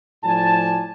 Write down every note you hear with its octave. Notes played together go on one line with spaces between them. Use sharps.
A2 F3 D5 G#5 A5